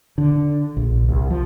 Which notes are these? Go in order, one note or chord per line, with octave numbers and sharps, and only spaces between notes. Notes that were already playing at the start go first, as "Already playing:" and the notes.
D3
A#1
C2
F3